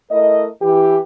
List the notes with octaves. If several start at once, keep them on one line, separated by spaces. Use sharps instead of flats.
A3 E4 A#4 D#5
E3 G4